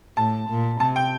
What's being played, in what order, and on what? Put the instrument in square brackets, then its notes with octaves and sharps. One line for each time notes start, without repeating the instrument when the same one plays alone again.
[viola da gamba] A2 [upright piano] A5
[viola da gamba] A#2
[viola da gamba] C3 [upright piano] A5
[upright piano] G5